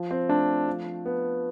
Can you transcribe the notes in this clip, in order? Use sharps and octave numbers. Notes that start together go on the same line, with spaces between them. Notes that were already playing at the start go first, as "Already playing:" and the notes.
Already playing: F3
C4
A3 D4
F3
B3